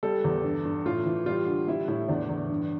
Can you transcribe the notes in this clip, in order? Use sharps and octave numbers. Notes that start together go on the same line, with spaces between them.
G3 A4
E2
G2
G2
A2 F4
E3
G3 F4
D3
G3 E4
A2 E4
E2 D4
E2
G2